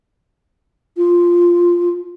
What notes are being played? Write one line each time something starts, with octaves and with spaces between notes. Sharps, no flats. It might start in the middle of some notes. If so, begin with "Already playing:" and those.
F4